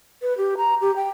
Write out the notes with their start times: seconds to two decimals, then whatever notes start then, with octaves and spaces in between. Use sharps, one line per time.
0.22 B4
0.38 G4
0.57 A#5
0.81 G4
0.96 G5